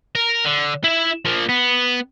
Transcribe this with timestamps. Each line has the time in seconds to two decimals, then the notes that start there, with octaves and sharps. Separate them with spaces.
0.15 A#4
0.45 D3
0.84 E4 E5
1.25 F3 A#3
1.49 B3